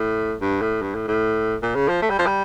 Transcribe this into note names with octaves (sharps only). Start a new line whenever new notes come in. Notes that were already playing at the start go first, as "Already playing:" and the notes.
Already playing: A2
G2
A2
G2
A2
A2
A#2
C#3
F3
A3
G3
F3
G3